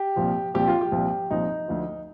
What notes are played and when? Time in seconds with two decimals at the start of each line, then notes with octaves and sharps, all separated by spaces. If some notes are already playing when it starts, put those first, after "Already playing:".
Already playing: G4
0.16 C2 A#2 F3
0.54 C2 A#2 F3 G4
0.68 F4
0.81 G4
0.92 C2 A#2 F3
1.30 C2 A#2 F3 D#4
1.68 D2 D3 F3